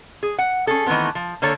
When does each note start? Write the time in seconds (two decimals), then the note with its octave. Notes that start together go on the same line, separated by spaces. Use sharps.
0.23 G#4
0.39 F#5
0.67 C#4 G#4 A4
0.86 D#3 E3 A3 B3 C4
1.15 F3
1.42 D3 A#3 A4 C#5